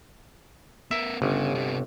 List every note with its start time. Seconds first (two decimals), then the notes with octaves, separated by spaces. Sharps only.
0.91 B3 A#4 E5
1.22 G1 C#3
1.55 C3 B3